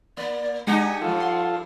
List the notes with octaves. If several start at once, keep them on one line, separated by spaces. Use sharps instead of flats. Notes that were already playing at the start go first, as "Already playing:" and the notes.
A#3 D5
G#3 D4 D#4 G4 F#5 G#5
G2 F3 F4 A4
C6